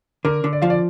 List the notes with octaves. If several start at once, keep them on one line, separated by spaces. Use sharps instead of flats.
D3 A#4
D3
D5
F3 F5
D5